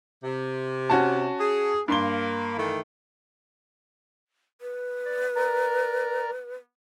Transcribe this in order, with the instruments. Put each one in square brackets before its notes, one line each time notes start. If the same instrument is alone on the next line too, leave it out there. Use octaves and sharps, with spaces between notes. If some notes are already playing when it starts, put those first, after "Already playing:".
[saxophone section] C3
[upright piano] C#4 F#4 A5
[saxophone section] G#4
[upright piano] G2 C6 G7 [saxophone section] A#3
[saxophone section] D#3 E3 A3
[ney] B4
[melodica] D5
A#4 D5 A#5